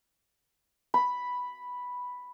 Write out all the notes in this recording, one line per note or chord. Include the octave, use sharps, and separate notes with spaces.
B5